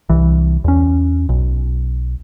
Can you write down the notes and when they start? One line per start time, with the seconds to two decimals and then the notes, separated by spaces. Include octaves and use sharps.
0.09 C2 E3
0.64 E2 C#4
1.29 B1